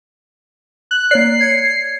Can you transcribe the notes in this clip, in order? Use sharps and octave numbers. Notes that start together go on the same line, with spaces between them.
F#6
A#3 C#5 D5 C7
G#6 C#7